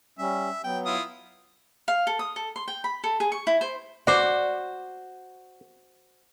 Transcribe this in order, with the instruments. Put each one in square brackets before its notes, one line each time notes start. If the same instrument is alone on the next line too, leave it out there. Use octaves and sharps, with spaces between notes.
[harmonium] G3 C#4 [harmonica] E5
[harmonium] F#3 B3 [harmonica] G5
[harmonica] E4 F4 D#6
[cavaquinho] F5
A4
D#6
A4
C6
G5
B5
A4
G#4
C#6
E4
C5
[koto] F#4 C5 [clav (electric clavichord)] D5